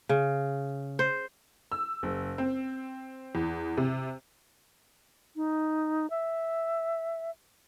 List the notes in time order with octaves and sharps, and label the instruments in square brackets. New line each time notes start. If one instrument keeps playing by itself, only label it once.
[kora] C#3
C5
[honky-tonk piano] E6
F#1
C4
E2
C3
[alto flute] D#4
E5